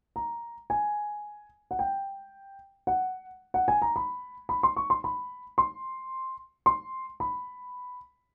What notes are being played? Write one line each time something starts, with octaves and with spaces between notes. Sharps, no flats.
A#5
G#5
F#5
G5
F#5
F#5
G#5
A#5
B5
B5
C6
C#6
C6
B5
C6
C6
B5